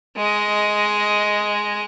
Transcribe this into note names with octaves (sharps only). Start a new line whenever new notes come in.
G#3 D#5